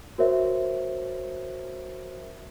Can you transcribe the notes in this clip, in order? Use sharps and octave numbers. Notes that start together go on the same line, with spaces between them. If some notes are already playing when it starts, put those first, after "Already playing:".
F#4 A#4 C5 C#5 E5